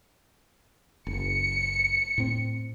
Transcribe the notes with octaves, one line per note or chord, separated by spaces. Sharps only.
F#1 C#7
A2 C4